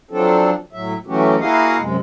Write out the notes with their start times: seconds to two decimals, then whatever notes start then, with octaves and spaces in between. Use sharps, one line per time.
0.11 F3 F#3 C4 D4 A4
0.73 A2 F#3 E5
1.07 E3 F#3 A3 C#4 F#4 G4
1.39 A#3 E4 F#4 G#4 D#5 F5
1.79 F#2 C3 G#3